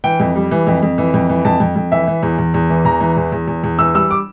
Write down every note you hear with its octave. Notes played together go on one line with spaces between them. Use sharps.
E3 G5
F2
G3
E3
F2
F2
E3
F2
E3
F2 A5
F2
F2
E3 E5
E3
E2
E2
E2
E3
E2 A#5
E3
E2
E2
E2
E2
E3 E6
G3 E6
D6